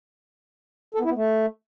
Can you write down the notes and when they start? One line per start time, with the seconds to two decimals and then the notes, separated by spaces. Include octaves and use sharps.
0.94 A4
1.00 B3
1.05 E4
1.10 B3
1.15 A3